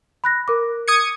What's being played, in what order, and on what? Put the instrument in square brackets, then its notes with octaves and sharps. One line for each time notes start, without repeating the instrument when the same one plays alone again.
[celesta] B5 F#6 A#6
A#4 D6
[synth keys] D#6 G#6 C#7